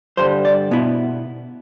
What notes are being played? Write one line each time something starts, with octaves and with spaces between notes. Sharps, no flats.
G2 D3 G3 C5
D5
B2 B3 E4